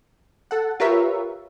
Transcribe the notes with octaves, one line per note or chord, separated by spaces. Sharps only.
A4 F#5
F4 G4 A#4 B4 C#5 E5